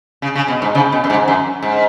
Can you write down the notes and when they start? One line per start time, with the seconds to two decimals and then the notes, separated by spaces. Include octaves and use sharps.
0.22 C#3
0.35 C#3
0.48 B2
0.62 G#2
0.75 C#3
0.92 B2
1.04 F#2
1.10 G#2
1.28 F#2
1.63 G#2